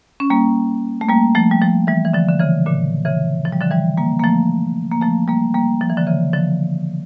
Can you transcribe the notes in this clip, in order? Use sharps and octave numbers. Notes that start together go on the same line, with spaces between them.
C#4
G3 A#3
A3
G3 A#3
F3 A3
G3
F3 A3
E3 G3
E3
D3 F3
D3
C#3 E3
A#2 D3
C#3 E3
F3
G3
D3 F3
E3 G3
G3 A#3
A#3
F3 A3
A#3
F3 A3
G3 A#3
G3 A#3
F3
E3
D3 F3
C#3 E3
D3 F3